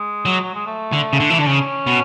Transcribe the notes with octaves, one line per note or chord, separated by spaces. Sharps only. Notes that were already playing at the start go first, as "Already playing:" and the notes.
Already playing: G#3
F#3
F#3
G#3
A3
D3
C#3
D3
E3
D3 D4
C#3 C#4
B2